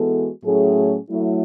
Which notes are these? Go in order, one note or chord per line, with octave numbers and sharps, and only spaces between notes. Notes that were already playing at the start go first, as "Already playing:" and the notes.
Already playing: E3 G#3 B3 F#4 A4
A2 F#3 A3 C#4 G#4
F#3 A3 E4